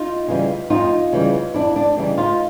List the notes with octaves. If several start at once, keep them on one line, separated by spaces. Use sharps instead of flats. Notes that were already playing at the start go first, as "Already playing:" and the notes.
Already playing: D#4 F4
C#3 E3 G3
F2 D#4 F4
C#3 E3 G3
F2 D4 E4
D4
C#3 E3 G3 D#4
D#4 F4